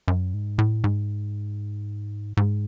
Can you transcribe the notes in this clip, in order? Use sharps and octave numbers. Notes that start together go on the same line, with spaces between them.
F#2
G#2
A2
G#2
G#2